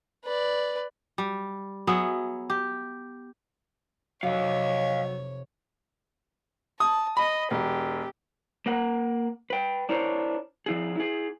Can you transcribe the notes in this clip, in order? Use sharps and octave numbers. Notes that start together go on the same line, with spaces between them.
B4 D5
G3
F#3 B3 G#4 E5
G4
F1 C3 F#3 C#5 D#5 F5
A5 D#6
D#5 B5
E1 G4
A#3 A#4 F#5
B4 G5
D4 E4 A#4 C5 C#5
F3 E4 G#4
E4 G#4